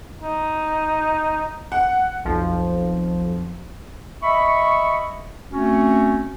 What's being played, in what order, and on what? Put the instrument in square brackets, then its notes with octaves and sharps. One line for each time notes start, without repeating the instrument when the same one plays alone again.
[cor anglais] D#4
[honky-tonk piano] F#5
[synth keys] B1 F2 F3
[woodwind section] D#5 E5 B5 C#6
A3 C4 C#4 F#4